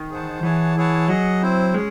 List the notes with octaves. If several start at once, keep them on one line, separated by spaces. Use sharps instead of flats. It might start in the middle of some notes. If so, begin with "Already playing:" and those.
Already playing: D#3
G#4 C5 F#5 A5
E3 G#4 C#5 F#5 A5
E4 G#4 C#5 F#5 A5
F#3 G#4 D#5 F#5
C4 E4 C5
G#3 C#4 G#4